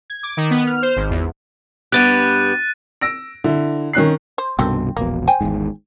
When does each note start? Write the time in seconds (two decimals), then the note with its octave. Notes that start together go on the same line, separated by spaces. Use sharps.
0.10 G#6
0.23 D6
0.37 D#3
0.50 B3
0.67 F6
0.82 C5
0.96 G#1
1.10 E2
1.92 G2 B3 G4 F#6 A6 D#7
3.01 E6 A#6 D7
3.44 D3 E4
3.93 D#3 C#4 F#6 C7
4.38 C5
4.59 C2 G2 B2 D3 D#3 C4
4.97 E1 A#1 B2 A#3
5.27 C5 G5 G#5
5.41 G#1 E2 G#2